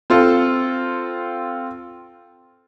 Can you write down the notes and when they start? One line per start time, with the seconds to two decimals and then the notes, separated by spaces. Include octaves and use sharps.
0.10 C4 F4 A4